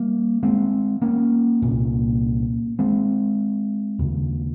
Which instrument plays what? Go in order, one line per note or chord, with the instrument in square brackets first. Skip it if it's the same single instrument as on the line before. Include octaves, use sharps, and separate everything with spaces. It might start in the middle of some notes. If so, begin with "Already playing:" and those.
Already playing: [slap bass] G3 A#3
G#3 C4
A#3 C#4
C2 A#2
G#3 C4
D#2 C#3